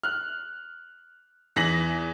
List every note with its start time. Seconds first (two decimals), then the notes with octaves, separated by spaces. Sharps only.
0.03 F6 F#6
1.56 E2 E3 A#6 B6 F#7